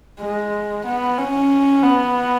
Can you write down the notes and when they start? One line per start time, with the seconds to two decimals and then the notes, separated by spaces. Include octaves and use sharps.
0.20 G#3
0.85 B3
1.18 C#4
1.83 B3